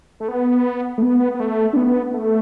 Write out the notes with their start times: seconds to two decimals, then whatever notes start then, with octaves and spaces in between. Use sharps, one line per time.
0.20 A3
0.28 B3
0.98 A3
1.03 B3
1.35 B3
1.40 A3
1.73 D4
1.76 B3
2.14 A3